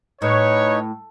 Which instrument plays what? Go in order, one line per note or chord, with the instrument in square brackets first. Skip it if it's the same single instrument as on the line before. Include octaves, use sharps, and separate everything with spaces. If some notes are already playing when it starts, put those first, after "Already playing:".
[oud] A2 [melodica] D#4 [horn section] B4 C#5